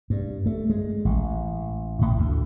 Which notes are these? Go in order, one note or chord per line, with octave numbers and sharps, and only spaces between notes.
G2
A3
G#3
A1
A2
D2